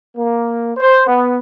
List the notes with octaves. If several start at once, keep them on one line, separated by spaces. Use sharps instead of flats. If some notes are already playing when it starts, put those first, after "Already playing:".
A#3
C5
B3